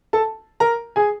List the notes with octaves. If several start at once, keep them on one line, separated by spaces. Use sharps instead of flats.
A4 A5
A#4 A#5
G#4 G#5